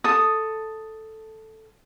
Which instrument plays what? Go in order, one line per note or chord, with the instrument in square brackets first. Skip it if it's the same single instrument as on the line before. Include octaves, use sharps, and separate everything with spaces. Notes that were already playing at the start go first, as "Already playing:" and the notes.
[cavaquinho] A4 D#6